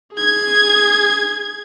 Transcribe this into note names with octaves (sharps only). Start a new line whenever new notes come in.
G#4 G#6